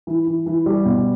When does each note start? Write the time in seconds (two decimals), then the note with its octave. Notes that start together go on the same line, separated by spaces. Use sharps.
0.07 E3
0.27 E3
0.46 E3
0.66 G3
0.85 B2